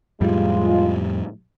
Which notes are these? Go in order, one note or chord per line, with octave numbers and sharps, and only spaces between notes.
F2 A2 G3 G#3 F4